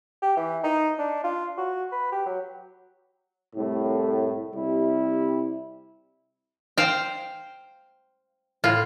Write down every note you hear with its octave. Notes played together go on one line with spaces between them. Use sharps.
G4
E3
D#4
D4
F4
F#4
B4
G4
F#3
C2 A2
C3 G3 E4
C5 F5 G5
A2 F4